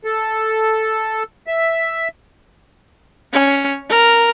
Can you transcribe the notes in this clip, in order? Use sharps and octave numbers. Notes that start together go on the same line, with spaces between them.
A4
E5
C#4
A#4